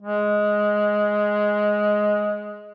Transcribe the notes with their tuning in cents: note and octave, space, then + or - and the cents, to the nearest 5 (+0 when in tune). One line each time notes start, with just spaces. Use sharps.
G#3 +5